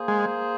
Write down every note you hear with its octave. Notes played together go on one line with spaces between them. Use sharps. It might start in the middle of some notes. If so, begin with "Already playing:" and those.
Already playing: A#3 G#4 C5
G#3